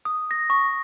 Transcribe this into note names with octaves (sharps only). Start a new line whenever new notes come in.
D#6
A#6
C#6